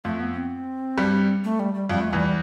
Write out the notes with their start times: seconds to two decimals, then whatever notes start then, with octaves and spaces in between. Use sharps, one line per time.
0.05 F2 F3 A3
0.20 B3
0.36 C4
0.98 G2 G3
1.44 A3
1.59 G3
1.74 G3
1.89 F2 F3 G3
2.01 A3
2.11 E2 E3 G3